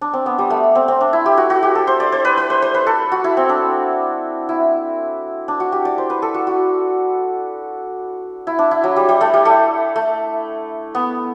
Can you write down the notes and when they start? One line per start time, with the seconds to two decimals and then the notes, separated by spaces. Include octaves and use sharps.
0.01 D4
0.13 C4
0.26 B3
0.38 G3
0.50 A3
0.75 C4
0.88 C4
1.01 D4
1.13 E4
1.26 G4
1.37 F#4
1.50 F#4
1.63 G4
1.75 A4
1.87 C5
2.00 D5
2.12 C5
2.25 B4
2.37 B4
2.50 C5
2.62 C5
2.74 B4
2.87 A4
3.12 F#4
3.24 E4
3.37 C4
3.49 D4
4.49 E4
5.48 D4
5.60 F#4
5.72 G4
5.85 D5
5.98 C5
6.10 B4
6.22 A4
6.34 F#4
6.47 F#4
8.47 E4
8.59 D4
8.71 E4
8.84 F#3
8.96 G3
9.09 G3
9.21 A3
9.34 G3
9.45 A3
9.96 A3
10.95 B3